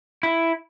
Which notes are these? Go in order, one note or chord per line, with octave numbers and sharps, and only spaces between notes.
E4